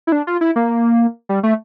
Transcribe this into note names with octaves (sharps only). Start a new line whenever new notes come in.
E4
D4
F4
E4
A#3
G3
A3